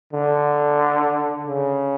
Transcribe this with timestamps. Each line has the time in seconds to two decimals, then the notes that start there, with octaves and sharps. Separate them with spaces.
0.13 D3
1.47 C#3